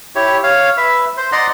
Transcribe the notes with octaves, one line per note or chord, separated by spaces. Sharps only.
E4 G4 C#5
C#5 F5
B4 E5
C5
D5 D#5 F#5 A#5 C6